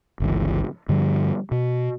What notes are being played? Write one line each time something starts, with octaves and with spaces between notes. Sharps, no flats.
G1 C#2 E3
G2 D3 F3 G3
B2